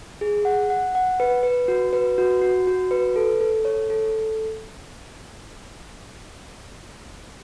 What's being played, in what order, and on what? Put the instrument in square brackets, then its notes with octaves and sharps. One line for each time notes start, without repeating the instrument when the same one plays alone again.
[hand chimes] G#4
F#5
F#5
F#5
B4
B4
F#4
B4
F#4
F#4
F#4
B4
A4
A4
C#5
A4